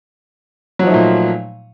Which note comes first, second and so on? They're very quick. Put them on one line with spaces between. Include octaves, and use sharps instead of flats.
F#3 F3 D#4 A3 A#2